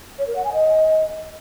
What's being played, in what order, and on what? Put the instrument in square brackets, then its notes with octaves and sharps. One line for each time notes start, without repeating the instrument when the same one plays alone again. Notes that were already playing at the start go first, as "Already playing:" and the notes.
[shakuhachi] C#5
A#4
F#5
G#5
D#5